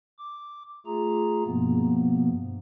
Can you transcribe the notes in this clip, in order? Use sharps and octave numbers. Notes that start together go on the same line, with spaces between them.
D6
A3 F4 G#4 A#5
G2 B2 F3 A#3 B3